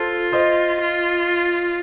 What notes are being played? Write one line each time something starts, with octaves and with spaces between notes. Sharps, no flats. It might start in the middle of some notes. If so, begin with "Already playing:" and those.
Already playing: F4 A4 C5
C5 D#5
F4